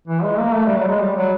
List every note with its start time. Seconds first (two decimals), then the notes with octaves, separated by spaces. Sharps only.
0.08 E3
0.23 G#3
0.39 A#3
0.54 A3
0.66 G3
0.78 F#3
0.88 G#3
1.00 G3
1.16 F#3